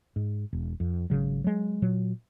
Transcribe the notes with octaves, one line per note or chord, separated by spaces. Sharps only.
G#2
E1
F2
G#1 C#3 F#3
F#3 G#3
A#2 F#3